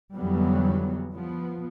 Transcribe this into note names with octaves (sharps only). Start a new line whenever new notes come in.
F2 D3 E3 F#3 G3 B3
F3 B3